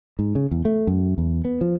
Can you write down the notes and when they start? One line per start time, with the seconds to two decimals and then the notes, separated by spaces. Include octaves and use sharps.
0.19 G#2
0.35 C#3
0.51 E2
0.65 A3
0.87 F#2
1.18 E2
1.45 B3
1.61 F3